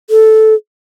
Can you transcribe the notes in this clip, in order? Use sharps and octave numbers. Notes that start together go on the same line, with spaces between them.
A4